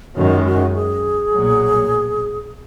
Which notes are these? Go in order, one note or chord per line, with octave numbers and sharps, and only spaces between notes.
F#2 D#3 G#3 F#4
F#4
G#4
B1 A#2 F#3